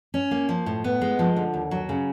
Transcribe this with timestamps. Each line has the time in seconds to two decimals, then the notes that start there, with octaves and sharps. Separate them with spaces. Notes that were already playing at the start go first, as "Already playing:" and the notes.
0.14 C#4
0.31 A#3
0.49 F3
0.66 A2
0.84 B3
1.01 G#3
1.19 F3
1.36 D3
1.54 D#2
1.71 F#3
1.89 C#3